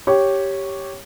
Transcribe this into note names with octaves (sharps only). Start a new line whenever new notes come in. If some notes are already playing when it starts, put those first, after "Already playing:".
G4 C#5